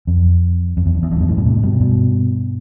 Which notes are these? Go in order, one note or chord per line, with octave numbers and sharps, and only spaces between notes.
F2
F2
E2
F2
E2
F2
A2
E2 G2
F2 A2
G2 B2
A2 C3
G2 B2
G2 B2